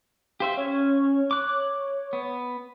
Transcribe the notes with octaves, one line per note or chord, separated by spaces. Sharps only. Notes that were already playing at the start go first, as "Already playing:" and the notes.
G4 C5 E5 F5
C#4 C#5
D6 F#6
B3